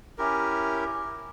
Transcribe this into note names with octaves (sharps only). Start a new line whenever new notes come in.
C#4 E4 G4 A#4